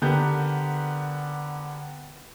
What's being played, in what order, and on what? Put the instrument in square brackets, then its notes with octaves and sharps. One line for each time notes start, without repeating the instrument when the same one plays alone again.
[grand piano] D3 B3 G4 A#4 G6